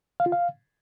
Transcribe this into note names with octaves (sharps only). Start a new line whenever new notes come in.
F5
F4
F5